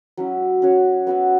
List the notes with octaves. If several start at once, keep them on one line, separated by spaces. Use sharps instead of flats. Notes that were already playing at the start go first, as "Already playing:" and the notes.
F#3 C#4 E4
C#4 F#4 C#5
B3 F#4 B4 E5